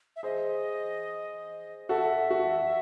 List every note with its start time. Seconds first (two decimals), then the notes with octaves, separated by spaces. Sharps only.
0.16 E5
0.23 G#4 C5 D#5
1.89 F#4 A4 E5
2.31 F#4